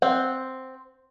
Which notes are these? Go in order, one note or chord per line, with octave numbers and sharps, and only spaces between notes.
C4 F#5